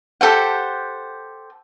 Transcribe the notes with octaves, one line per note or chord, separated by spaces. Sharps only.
G4 A4 C5 F#5